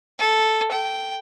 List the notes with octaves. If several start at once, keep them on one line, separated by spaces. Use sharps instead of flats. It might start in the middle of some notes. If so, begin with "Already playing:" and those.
A4
G5